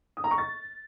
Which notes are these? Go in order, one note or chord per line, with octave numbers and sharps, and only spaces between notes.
D#6
A#5
C#6
A6